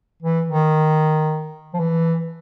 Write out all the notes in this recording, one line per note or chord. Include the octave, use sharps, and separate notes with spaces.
E3
D#3
F3
E3